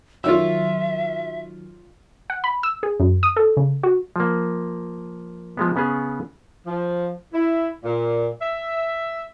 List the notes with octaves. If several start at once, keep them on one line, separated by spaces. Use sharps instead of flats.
D#3 F#3 F4 C#5 E5 E6
F#5
B5
E6
G#4
F#2
D#6
A4
C#3
F#4
F3 A#3
F3 G#3 B3
C#3 B3 C#4 G#4
F3
E4
A#2
E5